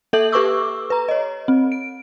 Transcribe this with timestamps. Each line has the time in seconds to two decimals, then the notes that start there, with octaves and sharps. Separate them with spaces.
0.13 A#3 A4 E5 G6 F#7
0.32 G4 A4 B4 C#6 D6 E6
0.90 B4 A#5
1.09 C#5 D#5
1.48 C4
1.72 D7